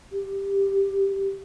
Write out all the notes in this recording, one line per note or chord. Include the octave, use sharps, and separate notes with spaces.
G4